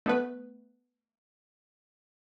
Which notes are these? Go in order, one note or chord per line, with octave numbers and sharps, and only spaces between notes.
A3 B3 B4